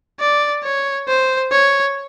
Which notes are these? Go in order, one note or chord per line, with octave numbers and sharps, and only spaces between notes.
D5
C#5
C5
C#5